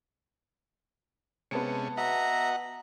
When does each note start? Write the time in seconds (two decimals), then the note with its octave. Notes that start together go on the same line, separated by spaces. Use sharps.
1.51 C3 G#3 B3 C#4 A5 C#7
1.97 F#4 D#5 E5 F#5 A#5